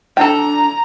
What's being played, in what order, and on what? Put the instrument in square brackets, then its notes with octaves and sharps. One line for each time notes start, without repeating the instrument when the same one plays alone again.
[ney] D4 [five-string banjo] A4 G5 [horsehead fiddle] A#5